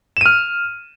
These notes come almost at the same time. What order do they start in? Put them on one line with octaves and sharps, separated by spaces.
E7 D#7 F6